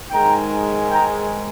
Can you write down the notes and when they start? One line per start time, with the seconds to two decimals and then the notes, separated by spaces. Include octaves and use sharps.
0.11 G#2 D#3 G#3 G5 A#5
0.91 G5 A#5